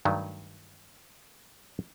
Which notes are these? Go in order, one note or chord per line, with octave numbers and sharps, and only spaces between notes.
G2 D#3 F#3 A3